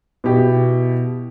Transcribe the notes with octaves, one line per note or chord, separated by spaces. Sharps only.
B2 E4 G4